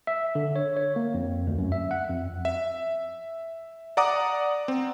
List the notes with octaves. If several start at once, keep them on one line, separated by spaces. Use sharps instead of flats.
E5
D3
C#5
C#5
A#3
F2
D2
F#2
E5
F#5
F2
E5
D5 F#5 A#5 D6 D#6
C4